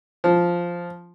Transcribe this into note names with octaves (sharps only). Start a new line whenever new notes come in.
F3